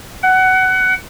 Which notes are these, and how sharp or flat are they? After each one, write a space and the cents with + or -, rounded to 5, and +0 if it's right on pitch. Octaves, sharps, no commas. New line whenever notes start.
F#5 +20